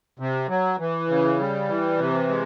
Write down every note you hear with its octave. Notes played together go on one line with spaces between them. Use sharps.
C3
F#3
E3
C#3
G3
E3
C3
G#3